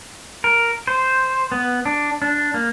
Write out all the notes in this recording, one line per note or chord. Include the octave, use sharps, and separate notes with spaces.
A#4
C5
B3
D4
D4
A#3